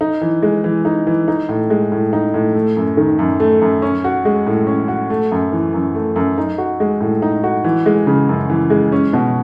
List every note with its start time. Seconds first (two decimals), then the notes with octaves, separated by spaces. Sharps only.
0.01 D#4
0.21 E3
0.43 G#3
0.64 E3
0.85 D#4
1.07 E3
1.28 D#4
1.49 A2
1.70 G#3
1.92 A2
2.13 D#4
2.34 A2
2.55 A3
2.76 F#2
2.97 D#3
3.19 F#2
3.40 A3
3.61 F#2
3.82 C#4
4.04 F#4
4.25 G#3
4.47 A2
4.67 C#4
4.88 F#4
5.10 A3
5.31 F#2
5.52 E3
5.74 F#2
5.94 A3
6.16 F#2
6.38 D#4
6.58 F#4
6.80 G#3
7.01 A2
7.22 D#4
7.43 F#4
7.64 E3
7.86 G#3
8.07 C#3
8.29 F#2
8.50 E3
8.70 G#3
8.92 C#4
9.13 B2